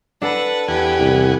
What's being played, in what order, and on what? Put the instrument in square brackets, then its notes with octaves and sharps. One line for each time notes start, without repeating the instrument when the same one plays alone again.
[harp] D4 A4 A5 [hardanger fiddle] B4 F#5
[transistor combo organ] E2 F#5 G#5 [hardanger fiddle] G4 B4
[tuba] C2